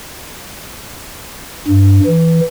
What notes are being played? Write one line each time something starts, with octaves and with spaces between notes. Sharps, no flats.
G2
E3